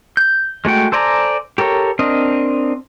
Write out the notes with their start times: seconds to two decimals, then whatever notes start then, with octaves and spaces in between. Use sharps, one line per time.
0.17 G6
0.65 G#3 A3 F#4 G5
0.92 A4 C5 D5 G#5 A#5
1.58 G4 A4 A#4 C#5
1.99 C4 D4 A#4 D#5